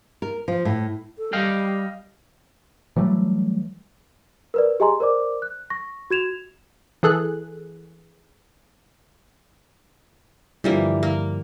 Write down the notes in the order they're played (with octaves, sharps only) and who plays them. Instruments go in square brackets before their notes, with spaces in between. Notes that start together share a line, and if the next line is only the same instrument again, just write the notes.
[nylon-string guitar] A#4
F3
A2
[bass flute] A4
[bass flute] G3 [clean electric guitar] D#5 F5 G5
[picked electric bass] E3 F#3 G3 A3
[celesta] A#4 B4 D5
G4 G#4 D#5 G#5 A#5 C6
A#4 C5 D5 D6
F#6
C#6 A#6
F#4 G#6 E7 F7
[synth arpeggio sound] E3 G#4 A4 F#6
[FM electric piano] G2 D3 F3 [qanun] E3 G3 A#3
[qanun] A#3